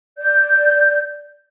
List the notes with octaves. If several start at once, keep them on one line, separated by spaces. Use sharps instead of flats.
D5 G6